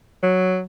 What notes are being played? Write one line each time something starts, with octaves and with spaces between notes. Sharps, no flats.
F#3